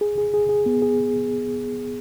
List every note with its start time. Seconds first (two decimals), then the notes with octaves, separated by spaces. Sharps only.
0.01 G#4
0.18 G#4
0.34 G#4
0.49 G#4
0.66 B3
0.82 G#4